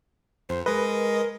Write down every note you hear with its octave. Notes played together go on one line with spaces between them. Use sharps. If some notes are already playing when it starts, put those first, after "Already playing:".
F2 C5
G#3 A#4 B4 D#5